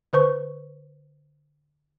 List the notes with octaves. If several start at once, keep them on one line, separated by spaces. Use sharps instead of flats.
D3 B4 C5 C#6